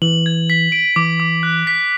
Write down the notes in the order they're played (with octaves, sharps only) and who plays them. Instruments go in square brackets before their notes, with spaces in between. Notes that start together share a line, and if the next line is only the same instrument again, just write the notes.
[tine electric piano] E3 [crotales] F#7
[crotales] G#6
B6
D7
[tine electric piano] E3 [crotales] D6
[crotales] D6
F#6
B6